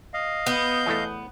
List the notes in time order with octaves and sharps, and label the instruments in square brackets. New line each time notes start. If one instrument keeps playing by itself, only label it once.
[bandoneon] D#5 F5
[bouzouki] B3 [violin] G6
[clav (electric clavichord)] E2 A2 A3